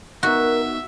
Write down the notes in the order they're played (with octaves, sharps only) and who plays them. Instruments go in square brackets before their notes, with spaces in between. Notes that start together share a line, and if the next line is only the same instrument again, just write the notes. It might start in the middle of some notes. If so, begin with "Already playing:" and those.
[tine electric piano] B3 D#4 F#6 [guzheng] F#4 [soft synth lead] A#4 [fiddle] E5